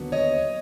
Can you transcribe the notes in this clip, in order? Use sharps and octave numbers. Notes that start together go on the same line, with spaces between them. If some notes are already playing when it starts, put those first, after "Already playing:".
Already playing: D#2 D3 F#3 B3
C#5 D#5